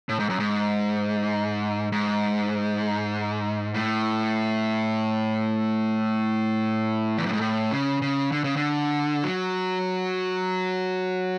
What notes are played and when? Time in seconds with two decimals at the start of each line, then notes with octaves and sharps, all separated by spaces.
0.09 A2
0.19 G#2
0.29 F#2
0.40 G#2
1.92 G#2
3.74 A2
7.18 E2
7.26 F#2
7.33 G#2
7.41 A2
7.71 C#3
8.02 C#3
8.32 D3
8.44 C#3
8.56 D3
9.24 F#3